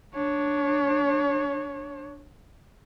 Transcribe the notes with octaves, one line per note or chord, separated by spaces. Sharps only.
D4 C#5